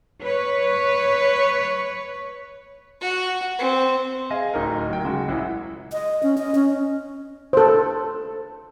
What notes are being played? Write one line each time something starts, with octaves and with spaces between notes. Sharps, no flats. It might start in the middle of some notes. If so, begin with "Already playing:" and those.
B4 C#5
F#4
C4
G#4 D#5 F5 G#5
D1 D#4 A#4
F#3 G5
C#3 G#3 F#4
A#1 E4
D#5
C#4
D#5
C#4
A4 C5